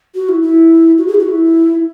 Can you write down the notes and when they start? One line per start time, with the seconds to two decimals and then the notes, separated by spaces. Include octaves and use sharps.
0.15 F#4
0.29 E4
0.42 E4
0.98 F#4
1.08 G#4
1.14 E4
1.19 F#4
1.29 E4